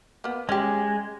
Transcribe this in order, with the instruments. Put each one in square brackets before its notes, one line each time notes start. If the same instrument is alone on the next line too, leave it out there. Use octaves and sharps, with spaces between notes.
[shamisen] A#3 B3
[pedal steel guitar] G#3 [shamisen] C#4 G4